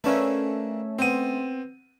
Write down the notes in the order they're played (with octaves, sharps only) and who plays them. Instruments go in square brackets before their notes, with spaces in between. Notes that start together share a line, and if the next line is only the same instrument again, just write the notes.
[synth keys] A3 C#4 E5 [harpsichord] A#3 D4 B4
[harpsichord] B3 C5 [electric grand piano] C4 D#7